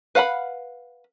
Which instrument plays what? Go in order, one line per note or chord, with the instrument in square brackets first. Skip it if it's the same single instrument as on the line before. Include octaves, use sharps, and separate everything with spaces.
[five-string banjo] B4 F5 F#5 A5 B5